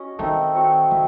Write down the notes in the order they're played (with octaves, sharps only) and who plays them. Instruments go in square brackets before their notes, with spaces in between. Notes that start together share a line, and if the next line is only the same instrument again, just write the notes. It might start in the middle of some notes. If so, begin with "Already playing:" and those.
Already playing: [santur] C#4 F#4 D#5
[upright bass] D#3 [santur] A3 C4 D#4
[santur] C4 F#4 C#5
[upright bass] D#3 [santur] E5